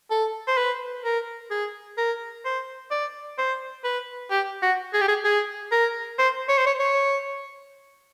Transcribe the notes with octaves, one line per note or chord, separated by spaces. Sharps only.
A4
C5
B4
A#4
G#4
A#4
C5
D5
C5
B4
G4
F#4
G#4
G4
G#4
G#4
A#4
C5
C#5
C5
C#5
C#5